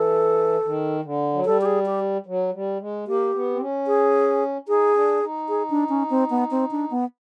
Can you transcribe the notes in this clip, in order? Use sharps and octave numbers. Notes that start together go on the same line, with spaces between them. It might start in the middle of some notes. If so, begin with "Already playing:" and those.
Already playing: E3 A4
D#3
D3
F#3
G3 A4
G4
G#4
G4
F#3
G3
G#3
A#3 G4
B3
C4
C#4
G#4
D#4 G#4
D4
D#4
G#4
D4
C#4
C4
B3
C4
D4
B3